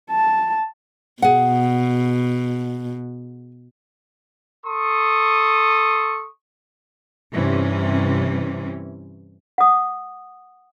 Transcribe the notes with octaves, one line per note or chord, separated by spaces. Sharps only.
A5
B2 G#4 F#5
A4 C6 C#6 D#6
G2 C3 E3 C#4
F#5 D#6